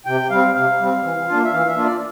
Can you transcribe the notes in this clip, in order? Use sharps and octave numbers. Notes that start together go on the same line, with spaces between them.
C3 G5
G3 C4 F5
C3 F5
G3 C4
E3
A#3 D4 F4
E5
E3 F5
E5
A#3 D4 F4
D5